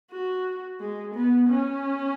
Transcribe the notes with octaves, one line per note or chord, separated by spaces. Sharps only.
F#4
G#3
B3
C#4